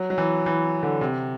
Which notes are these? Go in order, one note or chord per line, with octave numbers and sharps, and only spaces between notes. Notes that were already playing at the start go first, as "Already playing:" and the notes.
Already playing: F#3
F#3
E3
E3
D3
C3